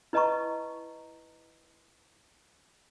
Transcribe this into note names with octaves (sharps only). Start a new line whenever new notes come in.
E4 B4 D#5 A5 A#5 C#6